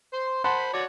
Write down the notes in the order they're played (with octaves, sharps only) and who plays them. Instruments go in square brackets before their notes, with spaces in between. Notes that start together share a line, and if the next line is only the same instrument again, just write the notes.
[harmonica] C5 C6
[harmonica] C5 B5 [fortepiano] F#5 A5 C6
[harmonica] F#4 C#5 D5